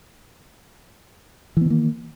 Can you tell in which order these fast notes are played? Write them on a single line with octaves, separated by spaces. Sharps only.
E3 B3 D#3 A#3